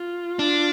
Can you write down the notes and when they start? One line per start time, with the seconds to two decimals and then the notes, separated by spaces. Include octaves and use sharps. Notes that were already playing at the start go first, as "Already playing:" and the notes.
Already playing: F4
0.39 D4